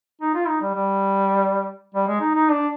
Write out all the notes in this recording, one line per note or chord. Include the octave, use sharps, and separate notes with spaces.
D#4
F4
D#4
G3
G3
G3
G#3
D#4
D#4
D4